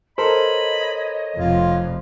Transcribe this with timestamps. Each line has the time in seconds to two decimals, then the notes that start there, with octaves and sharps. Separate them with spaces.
0.18 A4 A#4 C5 C#5 D#5 B5
1.38 F1 F2 F4